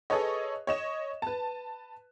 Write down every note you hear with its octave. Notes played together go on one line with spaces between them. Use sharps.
G#4 A4 B4 C#5 D#5
C#5 D#5 E7
B4 A5